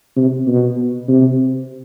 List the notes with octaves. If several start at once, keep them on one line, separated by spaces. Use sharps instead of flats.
C3
B2
C3